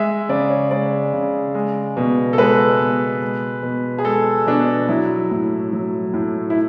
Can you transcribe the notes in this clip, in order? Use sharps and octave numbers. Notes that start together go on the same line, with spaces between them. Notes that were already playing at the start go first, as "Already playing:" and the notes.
Already playing: G#3 E5
C#3 D5
C#5
G#3 D5
C#3
G#3
B2
A4
G#3 B4
B2
G#3
B2
G#4
G#3 A4
B2 D4
F#3 E4
A2
F#3
A2
E4